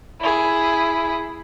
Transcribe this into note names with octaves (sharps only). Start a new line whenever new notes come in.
E4 G#4